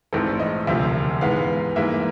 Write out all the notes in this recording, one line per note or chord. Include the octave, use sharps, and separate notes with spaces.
A#1 G#2 E3 A3 C4 A4
D#5
E1 D2 C3 F3 E5
G#2 E3 G#3 B3 F5
G#2 E3 G3 A#3 E5